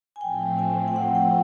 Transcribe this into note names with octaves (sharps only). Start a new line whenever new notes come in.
G#5
A2 F3 A3 C4 G5
G#5
G5
F#5
G5